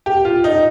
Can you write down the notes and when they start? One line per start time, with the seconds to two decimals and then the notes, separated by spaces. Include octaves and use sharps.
0.06 G4
0.25 F4
0.44 D#4